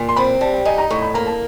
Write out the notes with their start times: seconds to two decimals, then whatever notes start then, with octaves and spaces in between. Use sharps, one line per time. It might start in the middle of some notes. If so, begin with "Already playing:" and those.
Already playing: A#2
0.09 C6
0.16 C4 B5
0.41 G3 A5
0.54 G5
0.65 D#4 G#5
0.78 A#5
0.91 A2 C#6
1.02 B5
1.14 A#3 A#5
1.27 A5